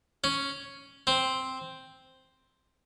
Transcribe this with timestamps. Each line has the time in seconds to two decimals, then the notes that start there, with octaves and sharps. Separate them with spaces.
0.24 C#4
1.07 C4